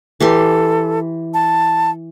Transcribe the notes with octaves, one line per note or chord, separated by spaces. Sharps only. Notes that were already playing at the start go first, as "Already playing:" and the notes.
E3 G4 A4 C6
A5